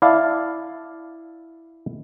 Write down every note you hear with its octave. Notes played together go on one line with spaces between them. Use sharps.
E4 D5 F5 A5